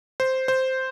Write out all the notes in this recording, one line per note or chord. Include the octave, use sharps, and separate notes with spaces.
C5
C5